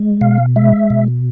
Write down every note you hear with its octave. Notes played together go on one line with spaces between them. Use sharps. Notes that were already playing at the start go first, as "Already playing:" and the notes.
Already playing: G#3
B2 F5
G#3 E5
B2